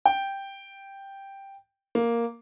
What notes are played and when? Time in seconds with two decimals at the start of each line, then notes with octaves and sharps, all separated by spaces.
0.06 G5
1.95 A#3